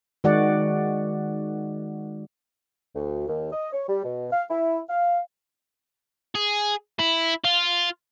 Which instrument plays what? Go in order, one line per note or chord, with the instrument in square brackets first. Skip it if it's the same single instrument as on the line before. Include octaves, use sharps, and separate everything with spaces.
[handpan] D#3 G#3 F#4 D5 F#5
[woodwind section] D2
D#2
D#5
C#5
G3
B2
F5
E4
F5
[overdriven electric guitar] G#4
E4
F4